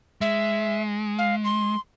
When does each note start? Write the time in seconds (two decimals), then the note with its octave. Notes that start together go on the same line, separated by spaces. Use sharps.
0.21 G#3 E5
1.18 F5
1.44 C6